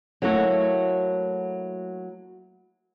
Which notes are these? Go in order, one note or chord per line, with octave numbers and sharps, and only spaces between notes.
F#3 A3 A#3 E4 F#4